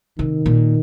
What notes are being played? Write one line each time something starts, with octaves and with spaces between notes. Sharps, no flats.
C3 D#3
A#2